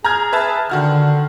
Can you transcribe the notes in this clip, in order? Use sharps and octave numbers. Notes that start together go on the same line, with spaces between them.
G#4 A#5 F6 G#6
B4 E5 A5
D3 D#3 F#4 F6